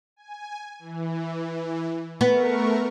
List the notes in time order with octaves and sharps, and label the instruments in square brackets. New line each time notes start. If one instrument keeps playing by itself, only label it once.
[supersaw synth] G#5
E3
[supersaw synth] A3 A#4 C#6 [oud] B3